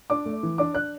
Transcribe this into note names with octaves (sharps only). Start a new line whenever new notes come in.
D4 D6
A3
E3
D4 D6
D4 F#6